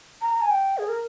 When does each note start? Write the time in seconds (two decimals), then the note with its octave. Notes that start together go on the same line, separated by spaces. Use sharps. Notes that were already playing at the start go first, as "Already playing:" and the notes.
0.22 A#5
0.33 A#5
0.42 G#5
0.51 G5
0.78 G#4
0.88 A#4